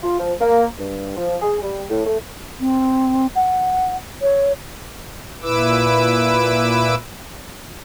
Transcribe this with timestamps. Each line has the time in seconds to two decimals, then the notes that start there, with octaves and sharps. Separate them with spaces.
0.03 F4
0.20 F3
0.40 A#3
0.78 G2
1.16 F3
1.42 G#4
1.62 G3
1.90 A2
2.06 A3
2.60 C4
3.35 F#5
4.22 C#5
5.42 A#2 E4 B4 D6 E6